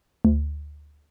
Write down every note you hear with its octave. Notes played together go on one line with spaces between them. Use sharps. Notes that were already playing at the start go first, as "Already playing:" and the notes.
D2